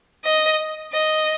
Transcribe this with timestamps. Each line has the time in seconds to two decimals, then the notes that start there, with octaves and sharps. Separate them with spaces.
0.25 D#5
0.93 D#5